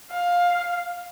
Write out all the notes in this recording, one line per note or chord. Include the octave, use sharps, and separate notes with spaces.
F5